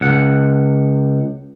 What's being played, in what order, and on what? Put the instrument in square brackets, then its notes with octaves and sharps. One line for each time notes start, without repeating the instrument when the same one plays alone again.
[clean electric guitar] C#2 F#5